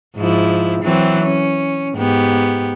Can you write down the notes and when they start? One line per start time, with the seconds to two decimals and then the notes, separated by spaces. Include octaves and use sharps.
0.17 G#2 F3 E4
0.82 E3 F#3 C4
1.23 C#4
1.95 G#2 B3 G4